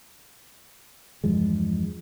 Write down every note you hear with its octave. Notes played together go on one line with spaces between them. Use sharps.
E2 G2 F3 G#3